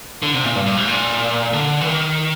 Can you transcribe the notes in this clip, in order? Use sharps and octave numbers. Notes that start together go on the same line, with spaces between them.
D3
C3
A#2
G2
G2
G#2
A#2
D3
E3
D#3